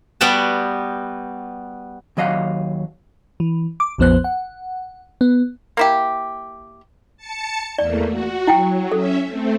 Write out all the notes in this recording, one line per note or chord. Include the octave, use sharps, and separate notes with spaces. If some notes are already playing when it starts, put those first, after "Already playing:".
G3 B3 F#4 G5 A5
D#2 F#3 D#5 F5 F#5
E3
D6
A#1 F2 F3 B3 C5 F#6
F#5
B3
A#3 E4 G4
A5 C#7
E2 A3 A#3 D5
F#4
F#3 E4 F#5 G5
C#4 A4 E5
A3 C4